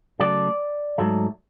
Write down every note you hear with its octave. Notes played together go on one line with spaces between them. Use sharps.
C#3 F#3 A3 D5
G#2 F#3 A3